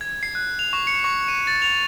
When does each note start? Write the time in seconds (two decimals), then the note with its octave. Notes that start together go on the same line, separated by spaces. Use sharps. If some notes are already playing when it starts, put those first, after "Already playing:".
0.01 G#6
0.23 C7
0.35 F#6
0.59 F7
0.73 C#6
0.87 C#7
1.04 C#6
1.28 D#7
1.47 A6
1.62 F7